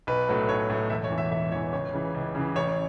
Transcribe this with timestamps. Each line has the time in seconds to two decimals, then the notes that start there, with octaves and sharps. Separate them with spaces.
0.07 B1 B4
0.28 A2 F#3 A3
0.48 B1 C#5
0.70 A2 F#3 A3
0.90 E1 E5
1.04 C#5
1.10 E2 E3
1.18 E5
1.31 E1 E5
1.52 E2 E3 C#5
1.72 C#2 C#5
1.93 C#3 E3
2.14 C#2
2.35 C#3 E3
2.56 A1 C#5